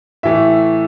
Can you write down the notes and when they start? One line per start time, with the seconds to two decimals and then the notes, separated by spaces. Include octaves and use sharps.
0.23 A2 E3 A3 E5